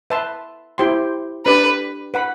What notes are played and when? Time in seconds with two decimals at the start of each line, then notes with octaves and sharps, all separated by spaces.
0.10 B4 E5 A5 C6
0.78 E4 G4 C5 G5 C6
1.45 D4 G4 B4 D5
2.14 B4 F#5 B5